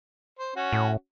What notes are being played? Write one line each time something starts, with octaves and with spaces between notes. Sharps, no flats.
C5
C#4 F#4
A2